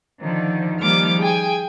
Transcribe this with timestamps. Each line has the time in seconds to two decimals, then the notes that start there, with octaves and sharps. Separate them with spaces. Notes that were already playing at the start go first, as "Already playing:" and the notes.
0.20 D3 D#3 F3
0.80 D#3 F3 G3 A#3 D6 F6
1.18 G#4 G5 G#5